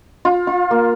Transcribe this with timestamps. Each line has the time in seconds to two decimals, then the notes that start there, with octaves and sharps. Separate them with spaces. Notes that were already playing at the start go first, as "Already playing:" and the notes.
0.25 F4
0.47 F4
0.71 A#3